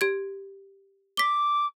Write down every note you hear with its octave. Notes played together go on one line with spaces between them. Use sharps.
G4 G#6
D6 B6 G7